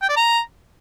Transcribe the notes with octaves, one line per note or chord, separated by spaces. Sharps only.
G5
D5
A#5